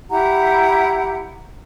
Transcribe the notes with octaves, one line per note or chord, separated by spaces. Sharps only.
E4 G4 F#5 A#5